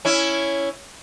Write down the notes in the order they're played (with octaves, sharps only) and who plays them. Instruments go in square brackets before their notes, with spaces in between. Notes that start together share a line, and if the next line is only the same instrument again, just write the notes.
[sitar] C#4 E4